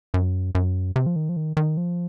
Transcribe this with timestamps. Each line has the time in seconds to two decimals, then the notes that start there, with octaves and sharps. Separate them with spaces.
0.14 F#2
0.55 F#2
0.96 C3
1.06 F3
1.16 D#3
1.29 F3
1.37 D#3
1.57 D#3
1.77 F3